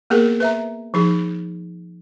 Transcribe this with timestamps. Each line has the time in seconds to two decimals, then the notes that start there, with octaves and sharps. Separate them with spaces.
0.10 A#3 B3 G#4 A#4
0.40 B4 E5 A#5
0.94 F3 D#4 G#4